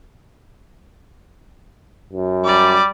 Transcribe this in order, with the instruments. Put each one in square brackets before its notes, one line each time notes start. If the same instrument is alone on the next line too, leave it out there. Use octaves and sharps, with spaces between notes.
[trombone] F#2
[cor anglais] G3 [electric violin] D5